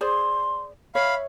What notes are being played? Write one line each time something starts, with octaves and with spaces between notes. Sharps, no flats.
G#4 C5 D5 C6
C#5 E5 F5 B5